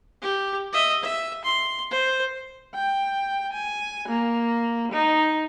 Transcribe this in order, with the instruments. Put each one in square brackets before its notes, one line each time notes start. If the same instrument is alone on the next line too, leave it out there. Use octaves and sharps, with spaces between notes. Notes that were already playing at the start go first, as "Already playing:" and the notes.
[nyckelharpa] G4
D#5 E5
E5
C6
C5
[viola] G5
G#5
A#3
D#4